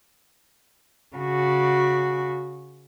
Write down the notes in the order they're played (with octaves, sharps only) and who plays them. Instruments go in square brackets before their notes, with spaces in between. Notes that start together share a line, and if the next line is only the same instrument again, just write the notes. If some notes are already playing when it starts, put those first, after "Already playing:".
[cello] C#3 F#4